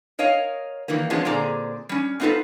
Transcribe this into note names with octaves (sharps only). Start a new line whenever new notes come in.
A#4 C#5 D#5 F5
D#3 E3 G3 A#3
F3 G#3 B3 C#4 D4 F4
A#2 D3 C4 G#4 D5 A#5
G3 C#4
B3 C4 D#4 F4 A4 B4